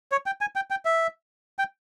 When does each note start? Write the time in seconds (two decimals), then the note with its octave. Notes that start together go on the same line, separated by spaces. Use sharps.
0.12 C#5
0.26 G5
0.41 G#5
0.56 G5
0.71 G5
0.85 E5
1.59 G5